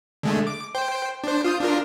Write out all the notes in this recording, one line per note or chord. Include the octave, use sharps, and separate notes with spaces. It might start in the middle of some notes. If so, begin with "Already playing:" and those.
D3 G#3 A3
D6
C5 G5
D4 C5
F4 D#6 G6
D4 F4 A#4